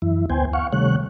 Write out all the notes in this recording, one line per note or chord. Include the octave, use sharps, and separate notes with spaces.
F#2 E3 E4
D2 B3 C5 G5 G#5
F5 F#5 C#6
C3 D#3 G3 A3 C#5 F#6